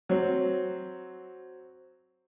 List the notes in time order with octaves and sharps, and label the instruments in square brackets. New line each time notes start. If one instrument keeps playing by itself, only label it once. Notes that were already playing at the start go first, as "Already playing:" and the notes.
[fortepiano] F#3 C4